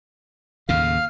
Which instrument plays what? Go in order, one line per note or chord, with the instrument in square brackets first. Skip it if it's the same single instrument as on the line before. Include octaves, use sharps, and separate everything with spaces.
[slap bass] D#2 A2 C#3 [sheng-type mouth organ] F5